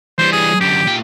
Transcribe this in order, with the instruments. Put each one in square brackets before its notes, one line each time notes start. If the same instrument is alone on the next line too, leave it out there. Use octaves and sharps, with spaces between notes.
[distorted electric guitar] E3 G3 [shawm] C5
[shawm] G#4
[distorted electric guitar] F#2 D3 [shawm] G4
[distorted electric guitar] A#2 G5